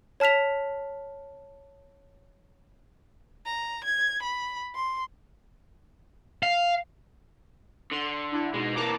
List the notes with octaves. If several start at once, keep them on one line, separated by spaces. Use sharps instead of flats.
C#5 A5 F6 B6 F7
A#5
G#6
B5
C6
F5
D3 C6
D4 E4
B2 G#3 D#4
E3 A#3 A5 A#5 D6